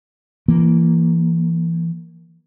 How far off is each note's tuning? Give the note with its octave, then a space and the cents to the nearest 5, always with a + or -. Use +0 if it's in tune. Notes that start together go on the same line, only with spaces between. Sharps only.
E3 +25 A#3 +0